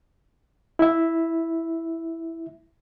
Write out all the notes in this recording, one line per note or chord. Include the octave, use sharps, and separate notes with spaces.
E4 E5